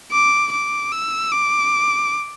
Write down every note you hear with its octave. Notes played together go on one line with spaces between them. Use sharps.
D6
D6
E6
D6